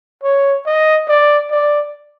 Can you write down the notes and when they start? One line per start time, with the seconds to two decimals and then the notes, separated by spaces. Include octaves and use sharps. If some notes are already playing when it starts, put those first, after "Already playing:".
0.23 C#5
0.66 D#5
1.08 D5
1.51 D5